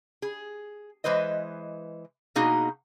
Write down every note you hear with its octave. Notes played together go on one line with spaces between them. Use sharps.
G#4
E3 G#3 B4 C5 D#5
B2 A#3 D#4 F#4 G#4